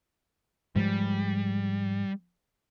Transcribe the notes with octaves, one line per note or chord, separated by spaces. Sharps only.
G#2 F3 G3 G#3